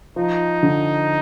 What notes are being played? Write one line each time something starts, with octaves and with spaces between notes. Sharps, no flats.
F3 D#4
D3